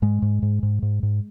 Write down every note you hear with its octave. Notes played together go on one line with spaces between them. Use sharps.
G#2 G#3
G#2
G#2
G#2
G#2
G#2